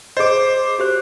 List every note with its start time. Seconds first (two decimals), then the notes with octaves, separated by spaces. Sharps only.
0.17 G#4 C5 D#5 D6
0.79 F#4 G4 C5